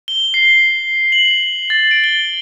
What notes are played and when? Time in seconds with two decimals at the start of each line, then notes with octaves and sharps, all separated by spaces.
0.08 G7
0.34 C7
1.12 F#7
1.70 A6
1.91 D7
2.04 G7